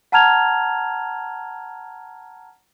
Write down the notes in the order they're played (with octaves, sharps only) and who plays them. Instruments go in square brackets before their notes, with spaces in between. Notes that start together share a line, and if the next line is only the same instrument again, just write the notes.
[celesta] F#5 A5 A#5 F6 G#6 F7